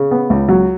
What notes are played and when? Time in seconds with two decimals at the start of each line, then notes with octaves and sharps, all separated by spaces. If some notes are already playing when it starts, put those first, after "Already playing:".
Already playing: C#3
0.11 B3
0.30 C#2
0.49 F#3